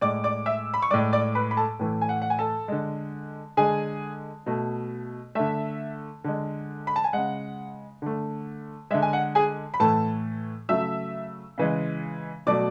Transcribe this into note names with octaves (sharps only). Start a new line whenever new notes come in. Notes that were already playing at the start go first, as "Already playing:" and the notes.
A2 G#3 D5 D6
D5 D6
E5 E6
B5
C#6
A2 G#3 D5 D6
D5 D6
B4 B5
B5
A4 A5
A2 E3 A3
G#5
F#5
F#5
G#5
A4 A5
D3 G#3
D3 G#3 G#4 G#5
B2 A3
D3 A3 E5
D3 G#3
B5
A5
G#5
C#3 G#3 F#5
D3 A3
D3 G#3 E5
G#5
F#5
G#4 G#5
B5
A2 E3 A3 A4 A5
C#3 F#3 A3 E5 E6
C#3 E3 G#3
B2 F#3 A3 D5 D6